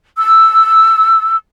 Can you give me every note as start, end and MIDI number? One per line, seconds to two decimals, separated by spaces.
0.18 1.35 88